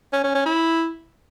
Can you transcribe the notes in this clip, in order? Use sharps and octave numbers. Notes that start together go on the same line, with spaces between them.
C#4
C#4
C#4
E4